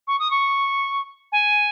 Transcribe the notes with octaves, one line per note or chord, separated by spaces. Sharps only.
C#6
D#6
C#6
G#5